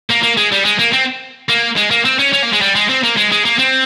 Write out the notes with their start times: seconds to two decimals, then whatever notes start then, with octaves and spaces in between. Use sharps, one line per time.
0.10 A#3
0.23 A#3
0.37 G#3
0.52 G3
0.65 G#3
0.79 A#3
0.93 C4
1.49 A#3
1.77 G#3
1.91 A#3
2.05 C4
2.19 C#4
2.33 C#4
2.42 A#3
2.53 G#3
2.61 G3
2.75 G#3
2.89 C4
3.04 A#3
3.17 G#3
3.32 G#3
3.45 A#3
3.59 C4